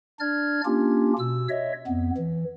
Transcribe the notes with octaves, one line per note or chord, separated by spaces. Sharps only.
D4 D5 F6 G#6
A#3 C#4 D4 F4 G4
B2 E6
C#5 D#5 E5
F2 B3
E3